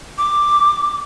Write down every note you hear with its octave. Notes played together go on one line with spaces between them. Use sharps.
D6